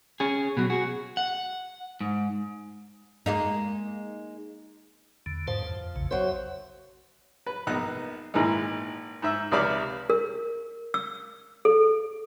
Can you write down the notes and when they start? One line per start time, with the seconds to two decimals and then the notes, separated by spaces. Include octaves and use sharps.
0.20 C#4 G#4
0.57 B2 F#3
0.70 F#4 G#4
1.17 F#5
2.01 G#2
3.26 G#3 A#3 D#4
5.26 E2 D3
5.48 G#2 F3 C5 A5
5.67 F2
5.96 A#1 E2 C#3
6.11 F#3 C5 E5
7.46 B4
7.67 A#1 B3 D#4 F#6
8.34 G#1 A#2 E3 G#3 D#4
9.22 G#2 E5
9.52 C#2 C3 D5 F5 B5
10.10 A#4
10.94 E6
11.65 A4